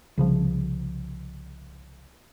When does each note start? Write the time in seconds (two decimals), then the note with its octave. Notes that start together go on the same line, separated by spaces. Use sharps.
0.17 C2 C#3 F3